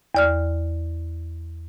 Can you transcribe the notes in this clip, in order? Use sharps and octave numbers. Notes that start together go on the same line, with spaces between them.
E2 D5 F6